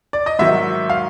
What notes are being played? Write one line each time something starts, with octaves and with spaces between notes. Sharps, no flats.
D5
D#5
G#2 D#3 F#3 E5
F5